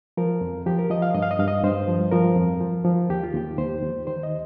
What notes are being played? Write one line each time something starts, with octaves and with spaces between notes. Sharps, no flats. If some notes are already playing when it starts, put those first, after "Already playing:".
F3 A#4
F2
F3 G4
A#4
F3 D#5
F5
G2 D#5
F5
D#5
G2 F5
D#5
G2 C5
F3
F3 A#4
F2
F3
F3
D#2 G4
F4
D#2 G4
D#2 C5
D#2
D#3 C5
D#5